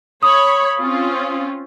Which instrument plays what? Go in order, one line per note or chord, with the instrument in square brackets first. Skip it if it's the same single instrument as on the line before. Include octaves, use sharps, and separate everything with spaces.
[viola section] C#5 B5 [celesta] D#6
[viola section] C4 C#4 F4